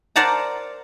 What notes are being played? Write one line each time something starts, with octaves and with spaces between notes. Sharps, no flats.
A#4 C5 D5 F#5 A5 A#5